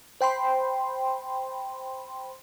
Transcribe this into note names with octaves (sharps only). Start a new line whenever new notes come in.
C5 G5 B5 C6